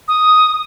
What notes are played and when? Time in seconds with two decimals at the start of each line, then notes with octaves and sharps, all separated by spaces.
0.08 D#6